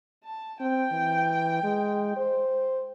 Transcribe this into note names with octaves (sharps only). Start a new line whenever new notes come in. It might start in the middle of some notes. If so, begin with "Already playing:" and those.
A5
C4 G5
E3
G#3
C5